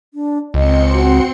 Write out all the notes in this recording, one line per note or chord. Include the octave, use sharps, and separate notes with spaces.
D4
C#2 C4 D#5 C6 C#7
F#4